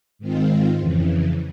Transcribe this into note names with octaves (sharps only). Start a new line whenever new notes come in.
G#2 D#3 G#3 C4 F4
F2 C#3 E3